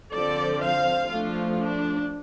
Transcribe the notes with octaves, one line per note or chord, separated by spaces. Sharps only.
D3 F3 C4 A4 D5
C5 F5
F3 A3 D4 F4
D4